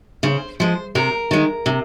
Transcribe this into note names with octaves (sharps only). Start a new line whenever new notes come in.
C#3 C5
F3 G#3 C5
C3 A#4
D#3 G#3
C3